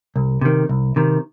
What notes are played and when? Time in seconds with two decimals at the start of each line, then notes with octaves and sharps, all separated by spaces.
0.16 C2
0.41 C3 D#3
0.69 C2
0.96 C3 D#3